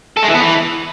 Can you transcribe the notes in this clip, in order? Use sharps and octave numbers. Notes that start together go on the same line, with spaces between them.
A4
G#3
E3
B3
E3